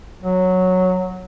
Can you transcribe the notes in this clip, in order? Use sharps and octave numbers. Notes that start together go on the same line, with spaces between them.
F#3